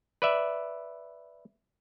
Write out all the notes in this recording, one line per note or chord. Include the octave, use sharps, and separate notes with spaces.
B4 D5 E5